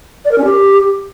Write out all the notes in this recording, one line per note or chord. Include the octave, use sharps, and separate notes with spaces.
D5
A#4
C#4
G4